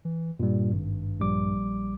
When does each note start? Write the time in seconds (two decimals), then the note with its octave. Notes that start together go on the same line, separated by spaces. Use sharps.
0.05 E3
0.40 G2 A#2 G3
0.73 G#1
1.20 A#1 G3 D6